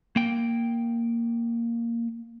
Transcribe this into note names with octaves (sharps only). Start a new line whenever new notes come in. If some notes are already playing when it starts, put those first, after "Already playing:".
A#3 G5